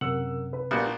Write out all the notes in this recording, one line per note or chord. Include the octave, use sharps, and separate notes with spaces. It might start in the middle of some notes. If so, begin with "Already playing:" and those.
F#2 C3 A#4 F#5 E6
B4
A#1 G3 B3 F#4